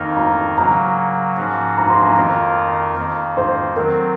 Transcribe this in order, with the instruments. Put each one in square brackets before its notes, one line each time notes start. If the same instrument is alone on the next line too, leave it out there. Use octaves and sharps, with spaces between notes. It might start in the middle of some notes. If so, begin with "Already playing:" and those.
Already playing: [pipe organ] F2 D#3 A#3 D#4 A#4
[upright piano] A#5
[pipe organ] C#3 F#3 A#3 [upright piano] A#5
[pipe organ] G#2 F3 A#3 C#4 F#4
[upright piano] A#5
C6
A#5
[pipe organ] F2 D#3 A#3 F4 A#4
F2 D#3 A#3
[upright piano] C5
[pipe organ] D#3 F#3 C4 [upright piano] A#4